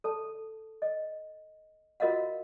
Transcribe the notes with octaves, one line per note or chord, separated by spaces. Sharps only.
A4 A5
D#5
F4 F#4 A#4 D#5 F5 F#5